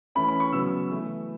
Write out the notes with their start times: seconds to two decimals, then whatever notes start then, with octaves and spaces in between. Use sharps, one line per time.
0.15 E3 A3 C#4 B5
0.28 B5
0.40 C#6
0.52 C#3 F#3 B3 E6
0.90 E3 A3 E4